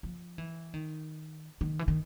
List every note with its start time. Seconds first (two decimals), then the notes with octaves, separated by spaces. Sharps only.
0.03 F3
0.38 E3
0.74 D#3
1.61 D#3
1.79 E3
1.88 D#3